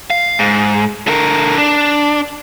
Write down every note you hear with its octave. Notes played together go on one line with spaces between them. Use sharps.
F5
G#2
D3 A#4
D4